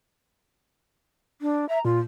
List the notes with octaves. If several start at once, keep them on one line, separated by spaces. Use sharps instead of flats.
D4
E5 A#5
A#2 F4